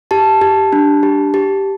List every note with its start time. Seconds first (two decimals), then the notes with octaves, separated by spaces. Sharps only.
0.11 G4 A5
0.41 G4
0.73 D4
1.03 G4
1.34 G4